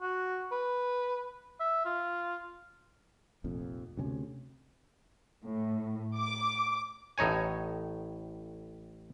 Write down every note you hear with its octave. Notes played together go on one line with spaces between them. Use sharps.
F#4
B4
E5
F4
F1 A#1 F2
D2 C3 B3 C#4
A2
D6
A1 A2 D#4 C#5 G#5